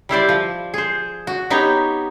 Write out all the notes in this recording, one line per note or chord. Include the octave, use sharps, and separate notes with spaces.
G3 E4 C5 D5
F3
G#4 C5
F#4
B3 D#4 G4 C#5